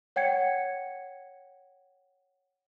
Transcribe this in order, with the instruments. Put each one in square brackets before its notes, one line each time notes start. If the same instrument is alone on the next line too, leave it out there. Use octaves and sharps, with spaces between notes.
[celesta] C#5 F#5 G5 G#6 C#7